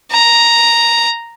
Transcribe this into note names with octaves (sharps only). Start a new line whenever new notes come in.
A#5